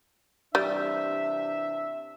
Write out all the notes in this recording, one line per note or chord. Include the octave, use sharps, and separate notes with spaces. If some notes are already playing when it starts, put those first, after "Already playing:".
C3 E3 G3 D4 E5